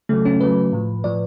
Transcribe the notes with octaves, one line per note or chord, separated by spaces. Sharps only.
C#3 F#3 A3
C#4
C#3 F#3 B4
A2 F3
A2 F3 D5